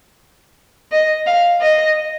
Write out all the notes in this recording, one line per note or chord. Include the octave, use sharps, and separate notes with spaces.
D#5
F5
D#5